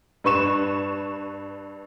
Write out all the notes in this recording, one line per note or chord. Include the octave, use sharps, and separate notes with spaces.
G2 B4 C#6 E7